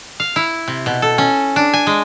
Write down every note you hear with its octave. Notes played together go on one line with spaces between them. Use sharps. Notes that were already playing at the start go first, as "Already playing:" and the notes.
F5
E4
C3
B2
A4
C#4
D4
G#5
G#3